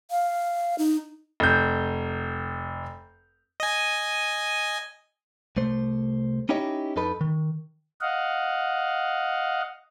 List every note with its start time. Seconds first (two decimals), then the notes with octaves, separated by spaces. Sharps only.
0.11 F5
0.78 D#4
1.40 F1 G6
3.60 D#5 G#5
5.57 C2 A3 C5
6.49 C#4 D#4 E4 G4 C#5 D#5
6.96 F2 D#4 A4 B4 B5
7.21 D#3
8.01 D#5 F5 F#5